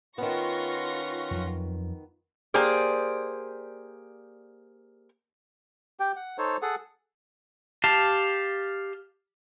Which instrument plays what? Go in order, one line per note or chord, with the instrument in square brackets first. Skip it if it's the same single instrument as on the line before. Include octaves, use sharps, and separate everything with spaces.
[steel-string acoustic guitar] D#3 B3 [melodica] C#4 F#5 [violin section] F4 C#6 A#6
[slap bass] F2 F#3
[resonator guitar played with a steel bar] A#3 G4 G#4 C5 D5
[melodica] G4 G5
F#5
D#4 A4 C5 C#5
G#4 A4 F#5
[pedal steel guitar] G4 F5 A5